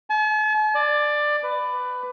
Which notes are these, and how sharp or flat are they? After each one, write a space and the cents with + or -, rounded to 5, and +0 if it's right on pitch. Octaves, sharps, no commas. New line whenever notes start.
A5 -45
D5 +15
B4 +15